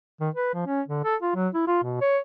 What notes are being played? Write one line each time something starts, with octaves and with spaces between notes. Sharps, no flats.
D#3
B4
F3
C#4
D3
A4
F4
F#3
E4
F4
B2
C#5